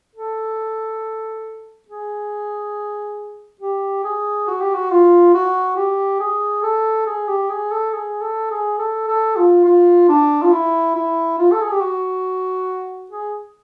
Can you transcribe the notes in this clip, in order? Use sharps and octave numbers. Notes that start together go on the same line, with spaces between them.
A4
G#4
G4
G#4
F#4
G4
F#4
F4
F#4
G4
G#4
A4
G#4
G4
G#4
A4
G#4
A4
G#4
A4
A4
F4
F4
D4
F4
E4
E4
F4
A4
G#4
G4
F#4
G#4